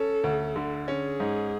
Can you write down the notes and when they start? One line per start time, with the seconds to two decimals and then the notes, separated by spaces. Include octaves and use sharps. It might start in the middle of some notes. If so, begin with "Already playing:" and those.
Already playing: C#4 A4
0.24 D2
0.56 D3
0.87 C#4 G#4
1.20 G#2